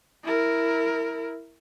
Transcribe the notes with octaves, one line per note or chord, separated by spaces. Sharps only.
E4 A#4